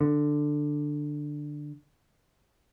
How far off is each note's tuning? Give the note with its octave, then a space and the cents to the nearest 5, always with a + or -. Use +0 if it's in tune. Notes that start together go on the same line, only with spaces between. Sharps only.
D3 +10